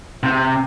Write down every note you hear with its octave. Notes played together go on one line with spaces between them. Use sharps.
C3